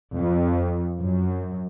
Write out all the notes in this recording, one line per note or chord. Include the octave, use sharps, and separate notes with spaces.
F2
F#2